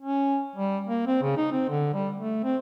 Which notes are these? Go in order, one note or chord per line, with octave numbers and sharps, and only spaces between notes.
C#4
G3
A#3
C4
C#3
D#4
C4
D3
G3
A3
C4